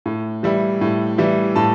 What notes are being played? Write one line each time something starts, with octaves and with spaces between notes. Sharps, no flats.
A2
E3 G3 E4
A2
E3 G3 E4
A2 A5